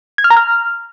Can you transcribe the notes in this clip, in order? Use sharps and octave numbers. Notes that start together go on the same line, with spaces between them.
G#6
F6
A#5
F6